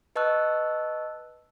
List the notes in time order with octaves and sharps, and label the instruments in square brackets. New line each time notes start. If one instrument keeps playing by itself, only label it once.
[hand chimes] B4 D#5 A5 C#6 E6 F#6